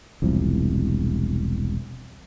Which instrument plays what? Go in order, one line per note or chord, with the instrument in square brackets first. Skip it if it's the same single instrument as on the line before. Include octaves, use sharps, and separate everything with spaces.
[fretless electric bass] E1 C2 F3